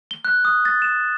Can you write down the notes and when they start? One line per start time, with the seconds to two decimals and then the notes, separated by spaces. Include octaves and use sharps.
0.11 G7
0.25 F#6
0.45 D#6
0.65 A6
0.82 E7